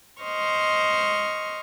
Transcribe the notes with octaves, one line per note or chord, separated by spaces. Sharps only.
C5 D#5 C#6 F6